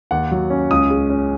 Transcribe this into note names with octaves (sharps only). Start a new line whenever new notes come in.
D#2 F#5
F#3
C#4
C#2 D#6
G#3
C#4